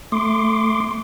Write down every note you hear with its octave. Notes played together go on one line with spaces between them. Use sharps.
A3 C6 D6